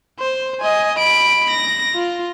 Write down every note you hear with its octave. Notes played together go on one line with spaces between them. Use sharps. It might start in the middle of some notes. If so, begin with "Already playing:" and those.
C5
D#5 G#5
B5 D7
A#6
F4